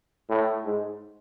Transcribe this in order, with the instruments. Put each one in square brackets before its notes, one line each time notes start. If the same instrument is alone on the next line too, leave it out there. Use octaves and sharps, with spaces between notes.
[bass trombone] A2
G#2